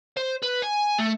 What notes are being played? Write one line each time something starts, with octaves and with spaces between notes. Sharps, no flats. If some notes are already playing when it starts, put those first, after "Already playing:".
C5
B4
G#5
A3